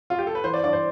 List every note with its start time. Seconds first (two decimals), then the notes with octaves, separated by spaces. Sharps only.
0.10 F4
0.19 G4
0.27 A4
0.35 B4
0.44 E3 C5
0.54 D5
0.64 G2 D5
0.73 C5